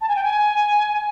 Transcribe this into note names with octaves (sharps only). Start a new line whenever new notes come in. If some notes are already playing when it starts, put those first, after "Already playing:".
A5
G#5
G5
G#5